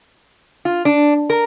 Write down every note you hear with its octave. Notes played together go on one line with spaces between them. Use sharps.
F4
D4
A#4